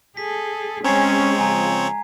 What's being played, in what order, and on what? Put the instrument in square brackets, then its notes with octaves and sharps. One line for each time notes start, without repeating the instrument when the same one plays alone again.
[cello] G#4 A4 [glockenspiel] B6
[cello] G#3 G#4 [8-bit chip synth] C4 C#5 [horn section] C#4 [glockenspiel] A#5 G#6 C7
[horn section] C#3 F3 [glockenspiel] G#5 A#5